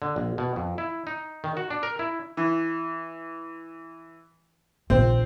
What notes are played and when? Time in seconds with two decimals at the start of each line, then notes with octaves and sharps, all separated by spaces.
0.02 D3
0.16 A#1
0.38 B2
0.56 F2
0.78 E4
1.07 D#4
1.44 D#3
1.57 F#4
1.70 D4
1.83 A#4
1.99 E4
2.37 E3
4.90 A#1 D#3 C4